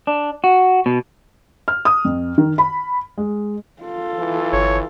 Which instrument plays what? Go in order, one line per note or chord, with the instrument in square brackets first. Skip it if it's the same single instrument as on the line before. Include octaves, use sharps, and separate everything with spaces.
[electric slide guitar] D4
F#4
B2
[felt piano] F6
D#6
F2
D#3
B5
G#3
[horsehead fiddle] F4 A4
[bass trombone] E3
[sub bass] G1 [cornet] C#5